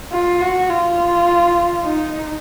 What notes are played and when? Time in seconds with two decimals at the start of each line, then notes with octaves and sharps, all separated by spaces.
0.13 F4
0.41 F#4
0.70 F4
1.83 D#4